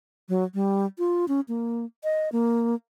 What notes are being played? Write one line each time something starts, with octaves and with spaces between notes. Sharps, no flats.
F#3
G3
F4
C#4
A#3
D#5
A#3